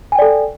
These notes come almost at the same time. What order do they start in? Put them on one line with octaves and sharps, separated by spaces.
G#5 G5 D5 A4